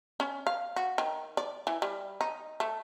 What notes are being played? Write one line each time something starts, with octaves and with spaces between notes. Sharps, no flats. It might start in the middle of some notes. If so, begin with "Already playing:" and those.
C#4
F5
F#4
D#3
D5
E3
G3
D#4
A3